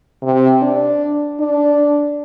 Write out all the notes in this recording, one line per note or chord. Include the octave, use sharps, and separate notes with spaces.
C3
D4
D4